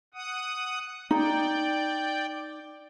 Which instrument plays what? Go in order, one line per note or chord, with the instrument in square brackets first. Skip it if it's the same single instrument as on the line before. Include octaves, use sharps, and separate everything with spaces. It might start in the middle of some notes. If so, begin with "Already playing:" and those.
[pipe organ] F#5 D#6
[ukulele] D#4 [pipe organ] D5 G5